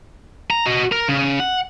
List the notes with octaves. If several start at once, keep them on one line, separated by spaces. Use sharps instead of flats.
A#5
F#4 D#5
A#4 A#5
C#3
F#5